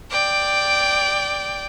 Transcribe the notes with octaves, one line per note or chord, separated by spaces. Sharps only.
D5 G5